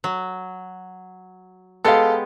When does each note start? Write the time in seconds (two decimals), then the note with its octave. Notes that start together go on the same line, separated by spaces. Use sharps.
0.04 F#3
1.84 G#3 B3 G4 A4 F5